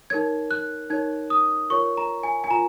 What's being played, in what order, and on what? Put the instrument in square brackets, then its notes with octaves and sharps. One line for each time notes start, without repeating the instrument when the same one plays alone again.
[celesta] D#4 A#4 C#5 G#6
F#6
D#4 A#4 C#5 G#6
D#6
F4 A#4 C#5 C#6
A#5
G#5
G#5
F4 A#4 A#5